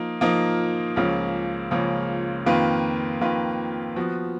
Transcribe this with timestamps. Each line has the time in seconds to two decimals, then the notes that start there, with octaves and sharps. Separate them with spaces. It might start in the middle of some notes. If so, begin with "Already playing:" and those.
Already playing: F3 A#3 D#4
0.21 F3 A#3 D#4 A#4
0.96 C#2 C#3 F3 A#3 C#4
1.71 C#2 C#3 F3 A#3 C#4
2.46 F2 D#3 A#3 F4 B4
3.21 F2 D#3 A#3 F4 B4
3.96 F3 B3 F#4